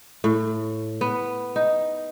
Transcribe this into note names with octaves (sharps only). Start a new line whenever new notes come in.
A2
B3
D#4